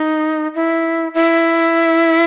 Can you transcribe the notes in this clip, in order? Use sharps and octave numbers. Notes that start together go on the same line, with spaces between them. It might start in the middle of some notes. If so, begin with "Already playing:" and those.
Already playing: D#4
E4
E4